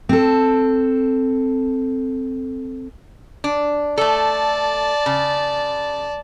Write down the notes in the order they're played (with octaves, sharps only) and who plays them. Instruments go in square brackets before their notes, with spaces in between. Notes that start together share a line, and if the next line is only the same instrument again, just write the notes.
[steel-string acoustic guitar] C4 A4
[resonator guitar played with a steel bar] D4
[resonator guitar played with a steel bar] A3 A4 [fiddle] D5 A5
[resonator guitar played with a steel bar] C#3